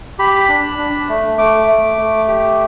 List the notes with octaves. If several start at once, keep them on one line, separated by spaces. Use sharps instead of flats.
G4 B5
D4
D4
A3
A3 D6
A3
A3
G4